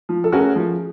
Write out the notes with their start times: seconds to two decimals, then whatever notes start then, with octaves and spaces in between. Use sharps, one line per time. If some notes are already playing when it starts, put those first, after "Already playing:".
0.09 F3
0.24 A4
0.32 A3 C#4 F#4 G#4 A#4
0.55 F3